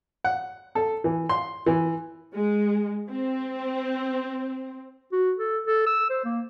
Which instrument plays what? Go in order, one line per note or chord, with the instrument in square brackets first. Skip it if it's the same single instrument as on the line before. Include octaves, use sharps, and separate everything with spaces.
[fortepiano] F#5
A4
E3
C6
E3
[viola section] G#3
C4
[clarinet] F#4
A4
A4
E6
C5
A#3